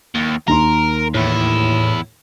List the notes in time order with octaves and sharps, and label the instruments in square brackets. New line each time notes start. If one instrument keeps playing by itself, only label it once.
[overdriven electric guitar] D#2
[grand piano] D#2 D#4 C6 [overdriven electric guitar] A#4
[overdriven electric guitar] E2 E4 [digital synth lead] A2